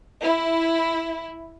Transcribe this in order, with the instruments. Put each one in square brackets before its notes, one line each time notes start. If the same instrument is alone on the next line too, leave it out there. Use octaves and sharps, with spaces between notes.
[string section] E4